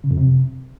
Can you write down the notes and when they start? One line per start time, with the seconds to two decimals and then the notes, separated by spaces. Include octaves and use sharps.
0.04 C#3
0.11 F2
0.17 C3